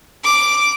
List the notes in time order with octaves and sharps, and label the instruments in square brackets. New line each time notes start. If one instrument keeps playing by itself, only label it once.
[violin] D6